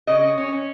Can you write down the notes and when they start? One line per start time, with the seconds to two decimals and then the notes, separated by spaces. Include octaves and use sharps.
0.07 C#3 D#5
0.22 C#4
0.38 C#4
0.52 C#4